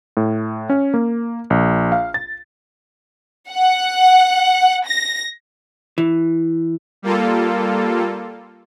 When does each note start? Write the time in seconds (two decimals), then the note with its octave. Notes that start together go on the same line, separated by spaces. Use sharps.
0.17 A2
0.70 C#4
0.94 A#3
1.50 A#1
1.92 F5
2.14 A6
3.51 F#5
4.87 A#6
5.98 E3
7.02 G3 A#3 F4 A4